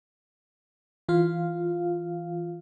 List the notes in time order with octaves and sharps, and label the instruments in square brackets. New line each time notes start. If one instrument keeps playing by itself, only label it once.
[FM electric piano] E3 F4 F5